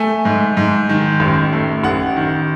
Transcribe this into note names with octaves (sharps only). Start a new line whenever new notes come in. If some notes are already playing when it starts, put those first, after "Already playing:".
Already playing: A3 G#5
G#2
G#2
D#3
A1
A3
A1 F#5
D#3